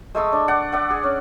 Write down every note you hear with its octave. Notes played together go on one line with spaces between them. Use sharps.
G#3 A3 D#6 E6
D4
D5 F#5
D5 E5 F#5
G#4
C#4